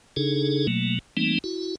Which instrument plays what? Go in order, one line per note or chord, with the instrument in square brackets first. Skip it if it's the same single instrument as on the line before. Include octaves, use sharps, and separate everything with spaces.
[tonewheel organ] C#3 D4 D#4 G#4 A4
B2 F#3 A3 A#3
E3 G3 A3 A#3 C4 D#4
E4 F#4